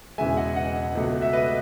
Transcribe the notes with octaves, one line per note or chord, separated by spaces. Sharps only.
E1 E2 C#3 G#3 E5 G#5
D#5 F#5
D#5 F#5
C#2 B2 A3
E5
B4 D#5